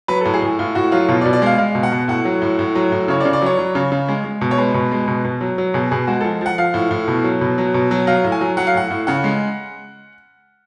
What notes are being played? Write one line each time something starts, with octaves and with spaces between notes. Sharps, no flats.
F#3 B4
A4
A2
G#4
A2
A2 F4
A2 F#4
F#3 F4
B2 F4
D5
B2
D5
G#3 F5
G#3 F5
B2
F#5
B2
A2 F#5
F#3
A2
A2
F#3
A2
C#3 C#5
D5
C#3
D5
F#3 C#5
F#3
C#3
C#3
G#3
G#3
B2
C#5
G#3 B4
B2
G#3
B2
B2
F#3
F#3
B2 G#4
B2 G#4
G#3 F#4
F3 A4
F3 F#5
F3 F5
A2
A2
B2
F#3
B2
F#3
B2
F#3
F#3 F5
A2
G#5
F#3
F#3 F#5
F5
A2 F#5
A2
C#3 F#5
G#3